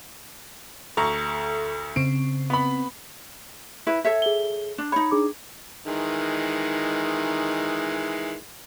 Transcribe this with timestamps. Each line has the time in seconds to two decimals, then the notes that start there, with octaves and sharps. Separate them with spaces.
0.97 D2 A4 A#5 C#6
1.96 C#3 C4 D7
2.50 B3 B5
3.87 E4 B4
4.05 A4 C#5 E5
4.22 G#4 G7
4.78 D4
4.92 D#4 C#5 B5
5.11 D4 G#4 D6
5.87 D#3 E3 G#3